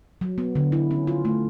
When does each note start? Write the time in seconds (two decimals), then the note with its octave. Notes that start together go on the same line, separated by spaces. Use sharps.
0.21 F#3
0.38 B3
0.55 D3
0.72 E4
0.91 C#4
1.07 F4
1.25 A3